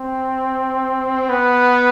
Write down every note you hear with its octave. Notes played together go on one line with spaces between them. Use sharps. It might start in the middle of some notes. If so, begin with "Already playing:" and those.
Already playing: C4
B3